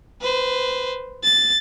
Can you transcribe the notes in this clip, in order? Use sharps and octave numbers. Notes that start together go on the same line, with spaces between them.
B4 C5
A6